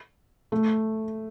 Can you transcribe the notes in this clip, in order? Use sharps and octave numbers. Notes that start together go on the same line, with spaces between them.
A3